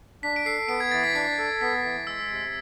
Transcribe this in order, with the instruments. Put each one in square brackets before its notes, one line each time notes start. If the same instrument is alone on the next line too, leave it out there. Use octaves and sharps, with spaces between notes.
[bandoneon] D4 [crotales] B6
[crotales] D7
[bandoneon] A4 [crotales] C7
[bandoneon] B3 [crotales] D7
[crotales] G#6
[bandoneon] E3 [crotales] A6
[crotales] B6
[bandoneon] D4 [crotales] C7
[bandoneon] A4
[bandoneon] B3 [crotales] B6
[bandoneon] E3
[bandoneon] G#3 [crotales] E6
[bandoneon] C3